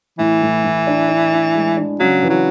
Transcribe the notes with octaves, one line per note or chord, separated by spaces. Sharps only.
A2 E3
A2
A2
D4
D4
D4
G#3
D4
C#3 F#3
E3
F#3